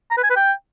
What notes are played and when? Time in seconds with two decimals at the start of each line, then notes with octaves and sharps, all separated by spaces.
0.11 A#5
0.17 B4
0.24 G#5
0.30 B4
0.36 G5